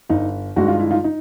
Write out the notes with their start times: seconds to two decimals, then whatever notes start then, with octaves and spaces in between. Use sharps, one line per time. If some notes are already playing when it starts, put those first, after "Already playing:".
0.09 G1 D#4
0.56 G2 D#3 G#3 F#4
0.68 F4
0.80 E4
0.91 D#4 F4
1.04 D#4